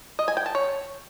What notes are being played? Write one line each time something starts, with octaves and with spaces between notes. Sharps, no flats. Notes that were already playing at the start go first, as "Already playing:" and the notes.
D#5
G#5
G5
A5
C#5